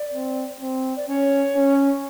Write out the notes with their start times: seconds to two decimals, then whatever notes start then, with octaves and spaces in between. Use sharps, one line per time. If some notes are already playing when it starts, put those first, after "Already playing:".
Already playing: D5
0.13 C4
0.61 C4
0.97 D5
1.08 C#4 C#5
1.56 C#4